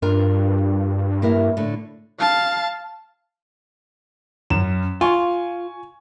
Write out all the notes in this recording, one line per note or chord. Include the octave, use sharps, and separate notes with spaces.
G2 D4 F4 A#4
A#3 E4 A#4
A2 D3
F5 A5
F#2 E7
F4 G#5 C#6